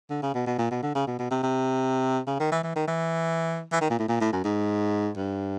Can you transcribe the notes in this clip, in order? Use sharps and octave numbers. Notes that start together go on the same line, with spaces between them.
D3
C#3
B2
B2
A#2
B2
D3
C#3
B2
B2
C3
C3
C#3
D#3
E3
E3
D#3
E3
E3
D#3
A#2
A2
A#2
A2
F#2
G#2
G2